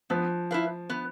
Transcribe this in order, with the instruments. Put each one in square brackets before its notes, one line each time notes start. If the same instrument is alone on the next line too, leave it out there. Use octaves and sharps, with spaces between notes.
[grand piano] F3 [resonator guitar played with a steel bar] B3
[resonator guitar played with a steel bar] E4 B4 F5
B3